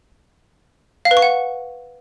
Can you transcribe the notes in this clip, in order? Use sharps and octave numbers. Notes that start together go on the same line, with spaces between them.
F5
B4
C#6
F#5